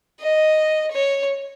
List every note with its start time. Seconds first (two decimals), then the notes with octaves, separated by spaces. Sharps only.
0.21 D#5
0.92 C#5